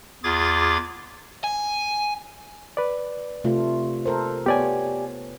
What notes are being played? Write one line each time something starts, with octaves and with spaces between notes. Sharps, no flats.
E2 F4 G#4 D6 G#6 A6
G#5
B4 D5
C3 A3 F4
A4 A#4 C5
B3 G4 C#5 D5 G#5